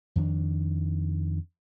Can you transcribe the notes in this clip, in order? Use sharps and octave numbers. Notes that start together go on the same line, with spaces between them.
F2 D#3 B3 D4